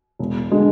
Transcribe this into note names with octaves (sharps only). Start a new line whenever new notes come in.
E1
D3 G#3